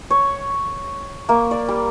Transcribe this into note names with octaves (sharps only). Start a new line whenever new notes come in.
C#5
A#3
D5
G3